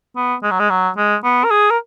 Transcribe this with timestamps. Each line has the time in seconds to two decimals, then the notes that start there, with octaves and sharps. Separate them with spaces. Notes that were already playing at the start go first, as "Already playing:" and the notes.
0.16 B3
0.43 G#3
0.51 F#3
0.60 G#3
0.70 F#3
0.97 G#3
1.24 B3
1.44 A#4
1.51 G#4
1.70 A#4